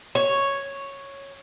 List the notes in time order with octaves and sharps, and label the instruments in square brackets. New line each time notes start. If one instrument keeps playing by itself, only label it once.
[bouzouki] C#5